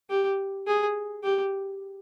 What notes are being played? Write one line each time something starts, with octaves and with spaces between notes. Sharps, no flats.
G4
G#4
G4